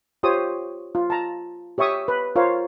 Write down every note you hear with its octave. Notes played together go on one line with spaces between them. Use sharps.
F4 G4 C5 C#5 D#6
F4
A5 A#5
G4 C#5 E5 C#6 D#6
B4
F4 A#4 C5 C#5 F5